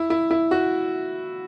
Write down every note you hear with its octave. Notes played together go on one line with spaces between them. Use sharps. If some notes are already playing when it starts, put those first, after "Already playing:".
Already playing: E4
E4
E4
F#4